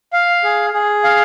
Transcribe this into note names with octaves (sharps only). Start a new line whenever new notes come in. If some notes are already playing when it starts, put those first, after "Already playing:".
F5
G#4
G#4
F5